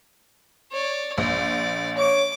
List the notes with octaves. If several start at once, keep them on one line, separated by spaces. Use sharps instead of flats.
C#5 D5
A#1 D5
C#5 D6